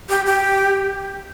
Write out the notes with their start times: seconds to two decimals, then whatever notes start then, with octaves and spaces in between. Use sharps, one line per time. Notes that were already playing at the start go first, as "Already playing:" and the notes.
0.09 G4
0.26 G4